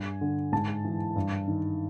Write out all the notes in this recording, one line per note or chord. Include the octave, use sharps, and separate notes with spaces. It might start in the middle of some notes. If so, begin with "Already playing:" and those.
Already playing: G2 G#5
D3
G#2 A5
E3
G2
D#3